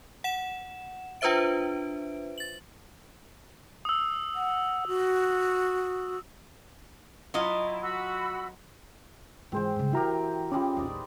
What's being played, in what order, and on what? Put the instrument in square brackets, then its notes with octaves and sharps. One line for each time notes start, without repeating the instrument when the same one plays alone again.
[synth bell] F#5 E7
D4 F4 B4 C5 E5 D7
A6 F#7
[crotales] D#6 E6
[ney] F#5
F#4
[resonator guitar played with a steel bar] F#3 F4 D#5 [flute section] E4
[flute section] F#4 B5 E6
[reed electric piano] G#2 G#3 G#4 [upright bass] E3 F4 [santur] C4 C5 G5
[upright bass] G2 C#3
[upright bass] E3 [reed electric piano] E4 F#4 A#5 [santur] G4 A#4 E5
[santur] G3 G#3 D6 [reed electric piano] C#4 F4
[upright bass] A#1 E2 [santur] D#4 D5